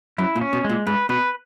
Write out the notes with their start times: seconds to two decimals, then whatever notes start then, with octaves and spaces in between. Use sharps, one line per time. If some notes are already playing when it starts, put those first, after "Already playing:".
0.18 F#2 E4
0.36 A#2
0.41 C#4
0.53 B2
0.65 A#2 G#3
0.87 G#2 B4
1.09 B2 B4